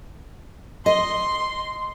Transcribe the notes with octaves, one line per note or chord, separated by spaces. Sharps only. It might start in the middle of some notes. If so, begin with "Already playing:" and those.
D#5 C6